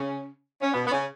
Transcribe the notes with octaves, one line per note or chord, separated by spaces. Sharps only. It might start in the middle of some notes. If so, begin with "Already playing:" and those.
Already playing: C#3 C#4
C#4
B2 B3
B3
C#3 C#4